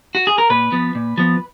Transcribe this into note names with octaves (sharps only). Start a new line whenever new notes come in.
F#4
G#4
A#4
A#2 B4
F3 B3
A#2
F3 B3